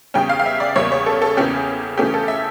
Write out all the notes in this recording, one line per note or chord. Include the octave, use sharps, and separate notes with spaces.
E2 C#3 G3 C#4 G5
F5
F5
E5
D5
E2 C#3 G3 A#3 C#4 C#5
C#5
A4
A4
E2 C#3 E3 A#3 C#4 G4
C#3 E3 A3 C#4 G4
A4
E5